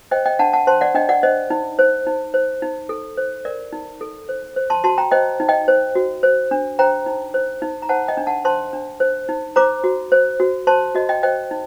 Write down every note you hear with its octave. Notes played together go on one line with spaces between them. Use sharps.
C5 D#5 G5
D#5 G5
D4 F#5 A5
F#5 A5
C5 A5 C6
D5 F#5
D4 D#5 G5
D5 F#5
C5 D#5
D#4
C5
D#4
C5
D#4
A4
C5
A#4 D5
D#4
A4
C5
C5
A5 C6
F#4 A5 C6
G5 A#5
C5 D#5 G5
D#4
D#5 G5
C5
F#4
C5
D4
C5 G5 A#5
D#4
C5
D#4
A#5
C5 F#5 A5
D#5 G5
D4
F#5 A5
C5 A5 C6
D4
C5
D#4
C5 A#5 D6
F#4
C5
F#4
C5 A5 C6
F#4 D#5
D#5 G5
C5 D#5 G5
D#4